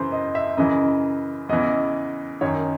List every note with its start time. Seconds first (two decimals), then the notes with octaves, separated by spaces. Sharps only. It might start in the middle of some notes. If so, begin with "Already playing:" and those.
Already playing: F#2 C#3 E3 C5
0.12 D#5
0.35 E5
0.57 F#2 C#3 E3 D#5
1.49 E2 C#3 E3 D#5
2.41 F#2 D#3 C#5